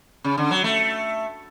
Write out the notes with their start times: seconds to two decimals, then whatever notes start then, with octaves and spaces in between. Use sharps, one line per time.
0.24 C#3
0.38 D3
0.51 F#3
0.64 A3